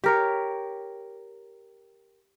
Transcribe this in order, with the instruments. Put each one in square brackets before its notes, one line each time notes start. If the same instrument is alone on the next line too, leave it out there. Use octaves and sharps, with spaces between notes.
[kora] G4 A#4 C#5